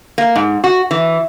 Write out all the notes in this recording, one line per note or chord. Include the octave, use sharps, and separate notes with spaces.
A#3
G#2
F#4
E3